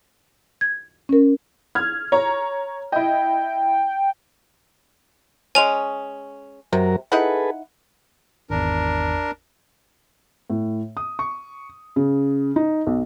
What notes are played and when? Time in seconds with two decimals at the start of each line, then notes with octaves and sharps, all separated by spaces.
0.61 G#6
1.09 C#4 A#4
1.75 F6 G#6
2.12 C#5 A#5
2.92 E4 D#5 G5
5.55 G#3 C#4 G#5 F7
6.73 F#2 C3 F#3 A#4
7.12 D#4 E4 G#4 A4 B4 F#5
8.50 G#1 E2 D4 A#4
10.50 A2
10.97 D#6
11.19 C#6
11.96 C#3
12.56 D#4
12.87 B1